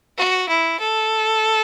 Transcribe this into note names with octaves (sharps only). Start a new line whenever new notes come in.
F#4
E4
A4